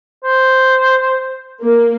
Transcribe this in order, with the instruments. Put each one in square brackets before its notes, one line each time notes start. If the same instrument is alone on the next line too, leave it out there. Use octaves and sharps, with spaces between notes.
[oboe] C5
[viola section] A#3